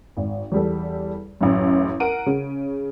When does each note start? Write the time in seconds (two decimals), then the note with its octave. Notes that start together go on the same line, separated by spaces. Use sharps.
0.17 G#1
0.52 E2 G3 A4
1.41 A1 F#2
2.00 A#4 F#5 D7 D#7
2.26 C#3